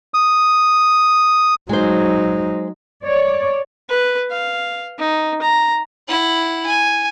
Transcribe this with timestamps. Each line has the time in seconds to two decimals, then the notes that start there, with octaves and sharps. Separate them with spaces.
0.14 D#6
1.69 F#3 G#3 D#4 C5
3.02 C#5 D5
3.89 B4
4.31 F5
4.99 D#4
5.42 A#5
6.08 E4 F#5
6.66 G#5